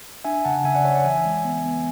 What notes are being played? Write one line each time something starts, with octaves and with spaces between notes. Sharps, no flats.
D4 E5 G#5
C#3 F#5 A5
C#3 E5 G#5
D5 F#5
C#3 C#5 E5
D5 F#5
E3 E5 G#5
G#3
B3
B3